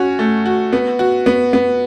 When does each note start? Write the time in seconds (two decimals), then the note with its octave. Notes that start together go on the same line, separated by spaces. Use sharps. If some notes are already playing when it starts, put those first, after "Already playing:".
Already playing: C#4 F#4
0.19 A3
0.46 F#4
0.73 B3
0.99 F#4
1.26 B3
1.53 B3